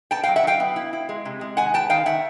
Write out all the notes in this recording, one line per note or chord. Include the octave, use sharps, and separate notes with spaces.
B3 G5 A5
F#3 F5 G5
E5 F#5
F#3 F5 G5
B3
E4
E4
G#3
C3
G#3
D#3 F#5 G#5
B3 G5 A5
D#3 F5 G5
D#3 E5 F#5